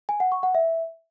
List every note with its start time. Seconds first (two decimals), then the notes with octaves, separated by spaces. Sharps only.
0.09 G#5
0.20 F#5
0.32 C#6
0.43 F#5
0.55 E5